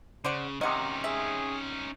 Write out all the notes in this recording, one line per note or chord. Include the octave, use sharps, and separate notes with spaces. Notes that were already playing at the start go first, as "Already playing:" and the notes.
C#3 C5 D5 F#5
C3 D#3 C#4 D#4 D#5 F#5
G#4 E5